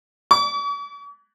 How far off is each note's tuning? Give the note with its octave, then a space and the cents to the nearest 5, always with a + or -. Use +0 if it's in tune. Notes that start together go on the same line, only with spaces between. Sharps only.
C#6 +45